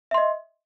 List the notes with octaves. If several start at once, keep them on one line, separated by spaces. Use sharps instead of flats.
D#5 E5 C6